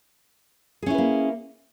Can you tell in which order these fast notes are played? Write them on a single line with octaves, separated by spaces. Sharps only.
G#4 C#4 E4 B4 A#3